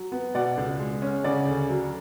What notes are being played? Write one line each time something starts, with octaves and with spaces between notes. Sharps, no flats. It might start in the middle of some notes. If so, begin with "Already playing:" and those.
Already playing: F#3
B3
B2 D5 F#5
C#2
G#3
C#4
C#3 D5 F#5
D2
F#3